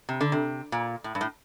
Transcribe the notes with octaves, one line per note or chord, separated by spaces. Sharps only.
C3
D3
C3
A#2
A2
G2
A2